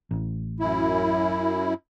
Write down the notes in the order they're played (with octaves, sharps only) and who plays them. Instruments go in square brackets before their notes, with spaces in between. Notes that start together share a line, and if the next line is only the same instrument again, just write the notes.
[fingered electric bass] A1
[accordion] F#2 E4